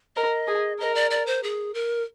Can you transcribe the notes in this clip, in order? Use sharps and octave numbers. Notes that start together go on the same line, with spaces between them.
A#4 D#5
G#4
A#4 D#5
D5
D5
C5
G#4
A#4